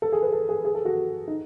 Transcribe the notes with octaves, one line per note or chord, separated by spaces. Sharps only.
A4
G#4
B4
A4
G#4
G#4
A4
F#4
D#4